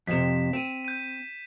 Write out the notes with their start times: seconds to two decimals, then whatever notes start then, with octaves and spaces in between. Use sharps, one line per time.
0.07 F2 A2 C3 B6 E7
0.53 C4 D#7 E7
0.85 G6 D#7